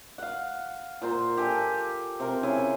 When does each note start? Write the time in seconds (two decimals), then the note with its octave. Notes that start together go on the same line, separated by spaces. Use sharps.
0.18 F5 F#5
1.02 A#2 C5 A#5
1.37 G4 A4 G#5
2.20 C3 A#4
2.43 C#3 E4 G#5